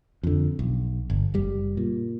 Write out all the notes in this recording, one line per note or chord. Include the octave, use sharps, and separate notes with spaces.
F2 D3
B1
G1
F#1 G3
A#2